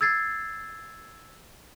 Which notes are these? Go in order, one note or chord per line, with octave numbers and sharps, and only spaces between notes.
E6 G#6 A6 C7